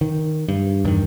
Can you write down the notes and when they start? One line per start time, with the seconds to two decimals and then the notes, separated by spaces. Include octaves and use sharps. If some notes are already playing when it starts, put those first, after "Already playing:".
0.01 D#3
0.48 G2
0.85 E2 G2 D3 D#3